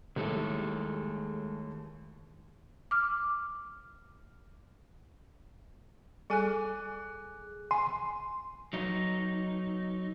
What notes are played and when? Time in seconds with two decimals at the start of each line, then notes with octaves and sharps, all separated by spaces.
0.16 D#2 A2 G3 G#3 A4
2.91 D6 F6
6.30 G3 G#4 A4 G#5 F#6
7.71 G#5 C6
8.73 F#3 D#4